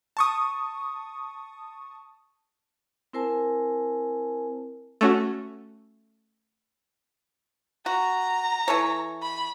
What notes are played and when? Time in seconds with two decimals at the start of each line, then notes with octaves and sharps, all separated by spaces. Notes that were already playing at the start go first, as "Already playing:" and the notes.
0.17 A5 C#6 D#6
3.13 C4 E4 A#4 C5 G#5 A5
5.01 A3 C#4 F#4
7.86 F#4 A#5
8.68 E3 A4 C#5
9.22 B5